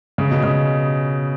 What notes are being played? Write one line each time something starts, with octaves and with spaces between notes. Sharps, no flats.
C#3
B2
C#3